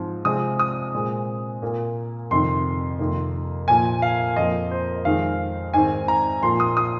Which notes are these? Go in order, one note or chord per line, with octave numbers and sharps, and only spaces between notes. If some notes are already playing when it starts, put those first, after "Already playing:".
Already playing: G#2 F3 C4
C3 F3 G#3 C4 D#6
D#6
A#2 G#3 C4
A#2 A#3
F2 C3 D#3 C6
F2 C3 D#3 A#3
A#2 F3 A#3 G#5
F5
F2 F3 A#3 D#5
C5
F2 D#3 G#3 C4 F5
G#2 D#3 C4 G#5
A#5
A#2 F3 A#3 C6
D#6
D#6